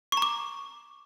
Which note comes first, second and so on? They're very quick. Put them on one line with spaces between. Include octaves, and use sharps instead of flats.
C#6 A#5 D6